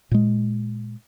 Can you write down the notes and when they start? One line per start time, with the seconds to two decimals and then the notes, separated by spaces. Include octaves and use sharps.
0.11 A#2 G#3